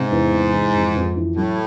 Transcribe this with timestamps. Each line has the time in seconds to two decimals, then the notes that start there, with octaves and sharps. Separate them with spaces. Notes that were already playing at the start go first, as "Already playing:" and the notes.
Already playing: G#2 C3
0.11 E2
0.32 C3
0.53 E3
0.74 F2
0.95 F2
1.16 E3
1.36 A2 F#3